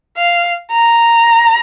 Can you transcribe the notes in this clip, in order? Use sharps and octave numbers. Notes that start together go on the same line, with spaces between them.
F5
A#5